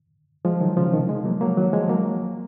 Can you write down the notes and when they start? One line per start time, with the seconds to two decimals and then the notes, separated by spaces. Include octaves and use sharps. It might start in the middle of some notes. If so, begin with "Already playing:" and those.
0.45 F3 G#3
0.61 D#3 F#3
0.76 C#3 F3
0.93 C3 D#3
1.09 F3 G#3
1.25 F#3 A#3
1.41 F#3 A#3
1.57 D#3 F#3
1.73 F3 G#3
1.89 F#3 A#3